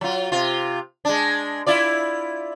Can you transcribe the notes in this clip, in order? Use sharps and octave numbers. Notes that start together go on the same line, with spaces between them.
F#3 F4
C3 F4
G#3 D4
E4 F4 D5